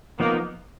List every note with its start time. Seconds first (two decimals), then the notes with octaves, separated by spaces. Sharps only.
0.19 F3 A#3 B3 D#4 A#4